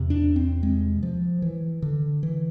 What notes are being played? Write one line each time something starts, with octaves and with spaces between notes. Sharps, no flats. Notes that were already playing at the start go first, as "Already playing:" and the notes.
Already playing: E2 C3
D4
C4
G#3
F3
E3
D3
E3